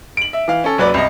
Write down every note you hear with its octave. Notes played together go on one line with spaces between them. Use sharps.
D7 F#7
E5
E3 F5
C#4 A4
F#1 F#3 B4 D5
C2 D#5